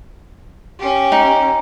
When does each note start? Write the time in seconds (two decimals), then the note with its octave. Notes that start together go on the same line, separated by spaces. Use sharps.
0.78 C#4 G4
1.12 D#4